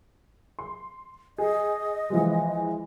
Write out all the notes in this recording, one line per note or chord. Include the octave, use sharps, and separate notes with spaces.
C6
G#4 D#5
E3 F3 G#3